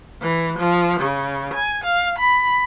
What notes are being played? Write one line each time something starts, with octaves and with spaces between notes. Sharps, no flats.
E3
F3
C#3
G#5
F5
B5